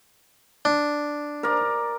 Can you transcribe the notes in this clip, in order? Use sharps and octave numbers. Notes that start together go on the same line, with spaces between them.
D4
A#4 D5